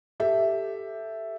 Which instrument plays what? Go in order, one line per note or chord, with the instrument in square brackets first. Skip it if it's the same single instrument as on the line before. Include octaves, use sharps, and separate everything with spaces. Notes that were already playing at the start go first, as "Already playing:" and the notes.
[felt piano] G4 A4 E5